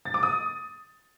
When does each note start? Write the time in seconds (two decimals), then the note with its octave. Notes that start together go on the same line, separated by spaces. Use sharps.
0.05 A6
0.14 D6
0.23 D#6